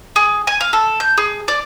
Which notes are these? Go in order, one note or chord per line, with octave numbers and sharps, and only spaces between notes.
G#4
G#5
F5
A4
G6
G#4
D5